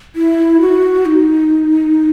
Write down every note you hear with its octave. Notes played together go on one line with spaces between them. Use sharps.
E4
F#4
D#4